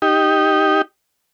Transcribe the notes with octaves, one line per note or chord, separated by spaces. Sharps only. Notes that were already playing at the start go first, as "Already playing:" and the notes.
D#4 G4